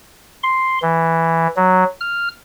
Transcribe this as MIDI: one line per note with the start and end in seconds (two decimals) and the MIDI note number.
0.43 0.79 84
0.82 1.47 52
1.56 1.84 54
2.01 2.29 89